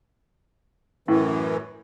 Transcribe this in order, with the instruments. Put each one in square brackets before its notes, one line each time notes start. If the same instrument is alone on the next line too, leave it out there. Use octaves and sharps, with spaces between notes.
[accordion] F#2 E3 [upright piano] A2